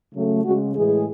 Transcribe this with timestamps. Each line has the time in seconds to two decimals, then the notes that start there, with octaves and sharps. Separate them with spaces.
0.13 C#3 F#3 A3
0.44 C#3 G#3 F#4
0.75 A2 E3 G#3 G#4